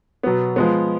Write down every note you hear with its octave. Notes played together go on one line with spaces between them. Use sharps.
B2 F#3 B3
F3 G#3 B3